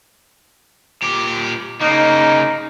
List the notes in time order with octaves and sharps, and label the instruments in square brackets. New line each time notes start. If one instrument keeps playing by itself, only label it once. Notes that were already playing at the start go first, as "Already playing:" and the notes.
[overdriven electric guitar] A#2 G4
[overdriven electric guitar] C#3 A#3 [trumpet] D#4